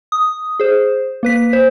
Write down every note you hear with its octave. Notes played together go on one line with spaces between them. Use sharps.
D#6
G#4 C5
A#3 B4 B6
C5